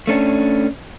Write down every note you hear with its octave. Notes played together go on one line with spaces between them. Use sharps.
A3 C#4 D4